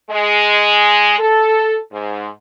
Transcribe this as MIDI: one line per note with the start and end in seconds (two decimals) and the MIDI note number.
0.10 1.18 56
1.19 1.77 69
1.92 2.27 44